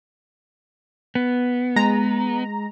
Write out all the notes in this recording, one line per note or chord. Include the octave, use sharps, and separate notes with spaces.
B3
G#3 A#5